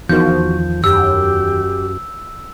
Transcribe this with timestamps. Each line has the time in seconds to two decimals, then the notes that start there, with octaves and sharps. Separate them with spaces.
0.09 E2 D#3 F3 F#4 G6
0.84 F#2 G4 E6